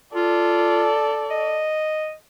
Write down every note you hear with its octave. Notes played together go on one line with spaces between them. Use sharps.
F4 A4 D5
D#5